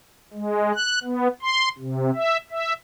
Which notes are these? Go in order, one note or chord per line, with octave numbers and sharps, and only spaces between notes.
G#3
F#6
B3
C6
C3
E5
E5